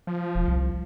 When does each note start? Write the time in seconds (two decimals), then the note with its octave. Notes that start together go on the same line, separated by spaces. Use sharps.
0.07 F3
0.35 E1
0.47 C2